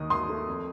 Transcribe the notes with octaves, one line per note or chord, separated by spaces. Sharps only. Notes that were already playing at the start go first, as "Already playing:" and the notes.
Already playing: D#2 D#3 D#6
D#2 C6 D#6
A3
F2